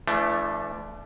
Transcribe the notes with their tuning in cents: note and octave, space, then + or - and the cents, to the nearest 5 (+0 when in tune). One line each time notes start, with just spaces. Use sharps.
E3 +40 A3 -10 D4 +0